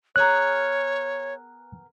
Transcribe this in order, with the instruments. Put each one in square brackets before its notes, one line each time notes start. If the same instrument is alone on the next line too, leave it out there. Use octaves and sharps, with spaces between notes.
[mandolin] B3 G#4 A#4 [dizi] C#5 [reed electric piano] F#6